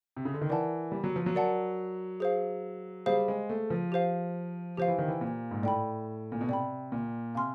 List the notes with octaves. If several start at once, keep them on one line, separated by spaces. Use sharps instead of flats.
C3
C#3
D3
D#3
E3 A#4 D5 F#5 A5
G3
F#3
F3
F#3
A#4 D5 F#5 A5
G#4 C5 F5
G3 G#4 C5 F5
G#3
A3
F3
G4 C5 F5
F3 G4 C5 F5
E3
D#3
E3
A#2
G#2
A2 D5 G5 B5
A#2
B2
C3 D5 G5 B5
A#2
C3 F5 G#5 C6 F6